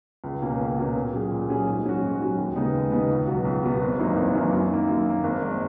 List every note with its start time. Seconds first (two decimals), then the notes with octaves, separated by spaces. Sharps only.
0.24 C#2
0.42 B2 A#3 C#4
0.60 C#2
0.78 B2 A#3 C#4
0.95 A#2
1.13 F#3 C#4 G#4
1.32 A#2
1.49 F#3 C#4 G#4
1.67 G#2
1.85 F#3 C#4 F#4
2.03 G#2
2.20 F#3 C#4 F#4
2.38 D#2
2.56 C#3 G#3 B3 D#4
2.73 D#2
2.92 C#3 G#3 B3 D#4
3.09 C#2
3.27 B2 F#3 B3 F#4
3.45 C#2
3.63 B2 F#3 B3 F#4
3.81 G#1
3.99 F#2 E3 A#3 D#4
4.16 G#1
4.34 F#2 E3 A#3 D#4
4.52 F#2
4.70 D#3 A#3
4.89 F#2
5.07 D#3 A#3
5.24 G#1
5.42 G#2 D#3